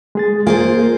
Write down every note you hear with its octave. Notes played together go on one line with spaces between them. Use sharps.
G#3 G#4 A6
A#3 F4 G#4 C5 G#5